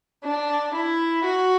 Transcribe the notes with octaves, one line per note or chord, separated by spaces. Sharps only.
D4
E4
F#4